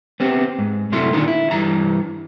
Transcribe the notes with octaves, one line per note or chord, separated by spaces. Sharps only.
B3 C4 G4
G#2
F#2 C3 F#3 A3 E4 C6
A#2 D3 D#3 D#4 F4 A#4
E4
G2 E3 A#5